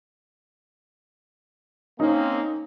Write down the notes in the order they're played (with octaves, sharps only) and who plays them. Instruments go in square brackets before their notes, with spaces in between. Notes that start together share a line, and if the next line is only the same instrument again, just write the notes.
[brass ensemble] A#3 C4 C#4 [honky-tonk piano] D#4